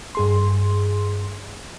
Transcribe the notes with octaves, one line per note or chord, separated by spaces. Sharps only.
G2 G#4 C6